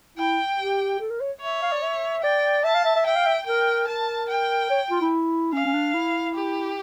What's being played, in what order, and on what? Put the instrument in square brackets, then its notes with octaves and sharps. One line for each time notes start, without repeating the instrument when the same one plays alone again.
[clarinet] E4 [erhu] G5
[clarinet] G4
A4
A#4
C#5
[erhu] C#5 [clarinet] E5
[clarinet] F5
D5
E5
[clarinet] D5 [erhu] G5
[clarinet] E5 [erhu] A5
[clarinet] F5
E5
E5
[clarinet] E5 [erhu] G5
[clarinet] F5
E5
[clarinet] A#4 [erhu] G5
[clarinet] A#4 [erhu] A5
[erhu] G5
[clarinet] C#5
F4
E4
[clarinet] C#4 [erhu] F5
[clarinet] C#4
D4
E4
[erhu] G4